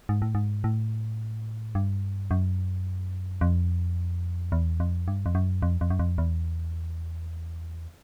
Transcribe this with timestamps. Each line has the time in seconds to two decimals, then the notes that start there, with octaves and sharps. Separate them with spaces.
0.09 G#2
0.22 A2
0.35 G#2
0.64 A2
1.75 G2
2.31 F#2
3.41 F2
4.52 E2
4.80 F2
5.08 G2
5.26 F2
5.35 F#2
5.62 F2
5.81 F2
5.90 F#2
5.99 F2
6.18 E2